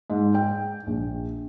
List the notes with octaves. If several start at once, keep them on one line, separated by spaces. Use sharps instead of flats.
G#2
G5
A#1